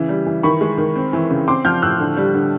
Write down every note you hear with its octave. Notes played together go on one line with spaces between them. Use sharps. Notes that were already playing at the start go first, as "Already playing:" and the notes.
Already playing: C#3 E3
G3
E3
D#3 B5 C#6
G#3
D#3
C4
E3
C#3
C4 C6 D6
F3 F6 G6
A2 E6 F#6
D3
G3
D3